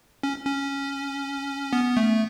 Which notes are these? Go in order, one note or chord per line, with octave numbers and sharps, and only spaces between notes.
C#4
C#4
B3
A3